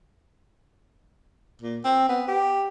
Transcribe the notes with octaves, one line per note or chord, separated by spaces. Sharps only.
A#2
C4
B3
G4